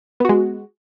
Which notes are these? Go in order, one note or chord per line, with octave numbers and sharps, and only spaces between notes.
G#3 B3 F#4